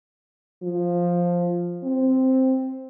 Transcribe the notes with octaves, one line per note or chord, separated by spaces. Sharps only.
F3
C4